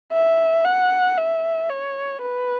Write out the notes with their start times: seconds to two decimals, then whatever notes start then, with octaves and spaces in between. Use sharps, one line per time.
0.12 E5
0.65 F#5
1.17 E5
1.69 C#5
2.21 B4